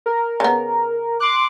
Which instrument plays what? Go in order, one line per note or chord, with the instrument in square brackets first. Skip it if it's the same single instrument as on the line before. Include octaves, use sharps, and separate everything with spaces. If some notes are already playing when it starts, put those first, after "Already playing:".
[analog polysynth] A#4
[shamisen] C#3 B3
[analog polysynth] C6 F#6 [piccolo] D6